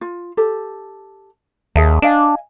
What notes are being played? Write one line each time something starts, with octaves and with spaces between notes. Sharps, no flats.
F4
G4 A4
D#2 G#4 E5 A5
D4 D#5 F5 G#5